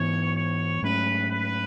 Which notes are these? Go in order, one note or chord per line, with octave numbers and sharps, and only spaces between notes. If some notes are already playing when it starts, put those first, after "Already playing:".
Already playing: G#2 E3 B3 C#5
C#5
G#2 F#3 A3 C#4 B4
B4